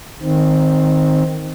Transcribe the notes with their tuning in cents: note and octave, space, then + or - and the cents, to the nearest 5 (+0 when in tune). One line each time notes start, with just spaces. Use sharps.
D#3 +0 C4 +0